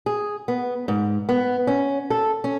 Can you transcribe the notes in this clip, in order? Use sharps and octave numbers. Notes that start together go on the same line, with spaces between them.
G#4
B3
G#2
B3
C#4
A4
C#4